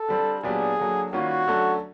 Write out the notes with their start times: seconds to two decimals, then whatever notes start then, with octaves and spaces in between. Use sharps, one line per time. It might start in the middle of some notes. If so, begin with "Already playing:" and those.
Already playing: A4
0.09 D3 G3 C4
0.43 A#2 F#3 B3 D4 G4 G#4
0.79 D3 F#3 A#3
1.13 D#3 G3 A#3 C#4 F4 F#4
1.48 D3 F#3 A3 C#4